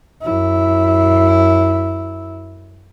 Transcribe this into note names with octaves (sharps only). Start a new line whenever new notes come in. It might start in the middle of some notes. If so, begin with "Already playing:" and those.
F#2 E4